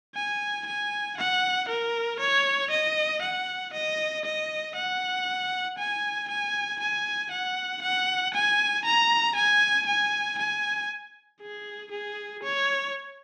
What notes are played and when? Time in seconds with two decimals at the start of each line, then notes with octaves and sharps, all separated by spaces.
0.15 G#5
0.67 G#5
1.18 F#5
1.69 A#4
2.20 C#5
2.71 D#5
3.22 F#5
3.73 D#5
4.25 D#5
4.76 F#5
5.79 G#5
6.29 G#5
6.80 G#5
7.31 F#5
7.82 F#5
8.34 G#5
8.86 A#5
9.36 G#5
9.87 G#5
10.39 G#5
11.41 G#4
11.91 G#4
12.43 C#5